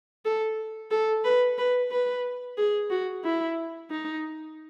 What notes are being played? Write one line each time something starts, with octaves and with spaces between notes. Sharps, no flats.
A4
A4
B4
B4
B4
G#4
F#4
E4
D#4